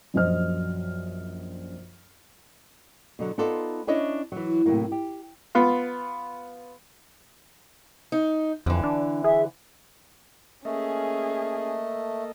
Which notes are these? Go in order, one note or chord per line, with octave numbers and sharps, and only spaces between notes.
A#1 F#2 C5 D#5 F6
B2 D3 F#3
B3 D#4 F4 A4 C5 D5
C#4 D4 E4 C#5 D#5
E3 F#3
A2 C3 E3 F#3 A#3
G4
B3 F4
D#4
F2 D3 E3
D4
G#4 E5
A3 A#3 C#4 G#4 A4 D#5